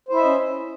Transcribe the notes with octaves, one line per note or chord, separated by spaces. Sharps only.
C#4 E4 C5 D#5 E5